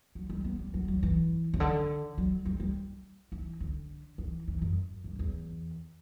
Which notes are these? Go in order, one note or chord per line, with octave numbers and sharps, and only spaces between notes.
F#3
G3
B3
G3
F#3
F#3
E3
C#3
D3
F#3
G3
G3
E3
D3
E3
E3
F#2
G2
E2